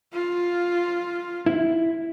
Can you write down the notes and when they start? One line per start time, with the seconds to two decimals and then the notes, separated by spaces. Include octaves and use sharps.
0.13 F4
1.46 E4